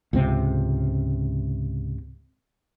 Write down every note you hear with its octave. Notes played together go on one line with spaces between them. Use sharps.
C#2 G#2 C3 C4